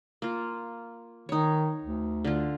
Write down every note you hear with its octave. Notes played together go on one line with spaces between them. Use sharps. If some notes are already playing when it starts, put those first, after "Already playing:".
A#3 F4
D#3 D#4 C#5
D2
D3 F4